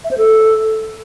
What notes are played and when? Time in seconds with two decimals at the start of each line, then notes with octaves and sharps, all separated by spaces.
0.04 E5
0.11 C5
0.18 A4